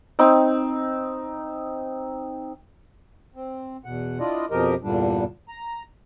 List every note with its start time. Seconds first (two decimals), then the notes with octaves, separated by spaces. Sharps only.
0.19 C4 D#4
3.35 C4
3.85 E2 B2 F#5
4.19 D4 E4 F4 D5 D#5
4.51 F2 B2 F3 G4 A#4 D#5
4.83 E2 G2 A#2 D3 G3 D4
5.48 A#5